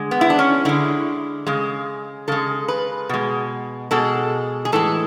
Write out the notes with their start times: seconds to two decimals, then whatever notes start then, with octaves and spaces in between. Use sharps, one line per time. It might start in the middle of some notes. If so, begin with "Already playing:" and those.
Already playing: D3 G#3
0.11 B3
0.21 E4
0.30 D4
0.39 C#4
0.65 D3 G#3 E4
1.47 C#3 G#3
2.28 C#3 G#3 A4
2.68 B4
3.09 B2 G#3
3.91 B2 G#3 A4
4.65 G#4
4.72 A2 E3 G#3 A4